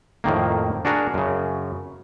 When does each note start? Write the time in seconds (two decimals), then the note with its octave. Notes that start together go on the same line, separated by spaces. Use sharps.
0.24 F2 A2 D#3 A#3
0.85 D4 F#4 G#4 A#4
1.14 F#2 C#3